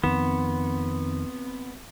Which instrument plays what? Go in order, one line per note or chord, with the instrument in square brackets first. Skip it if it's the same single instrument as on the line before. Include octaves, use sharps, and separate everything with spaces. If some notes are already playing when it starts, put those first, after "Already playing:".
[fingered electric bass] F2 D#3 [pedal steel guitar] B3 [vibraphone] C4